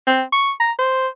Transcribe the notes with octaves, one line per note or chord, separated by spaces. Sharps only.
C4
C#6
A#5
C5